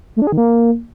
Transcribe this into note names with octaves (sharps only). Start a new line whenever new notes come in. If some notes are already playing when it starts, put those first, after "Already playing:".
A3
D4
G#4
D#3
A#3